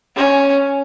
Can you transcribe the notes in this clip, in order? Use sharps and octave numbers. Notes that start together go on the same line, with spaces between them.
C#4